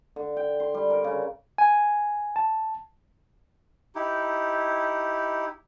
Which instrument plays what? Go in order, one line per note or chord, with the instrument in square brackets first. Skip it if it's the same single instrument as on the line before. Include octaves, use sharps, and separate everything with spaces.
[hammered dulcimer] D3
G5
C6
G3
A#4
C#3
[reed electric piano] G#5
A5
[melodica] D#4 E4 G4